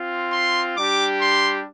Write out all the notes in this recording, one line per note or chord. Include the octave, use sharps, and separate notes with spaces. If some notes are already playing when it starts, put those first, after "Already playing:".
Already playing: C4 F4
C6
G3 D4 G4 D6
C6